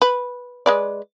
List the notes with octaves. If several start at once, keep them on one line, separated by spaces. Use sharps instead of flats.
B4
G#3 B4 D5